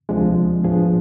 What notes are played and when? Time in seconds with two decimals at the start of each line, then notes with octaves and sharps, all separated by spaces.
0.09 D2 C3 F3 G#3 D4
0.64 A2 F3 B3 D4 G#4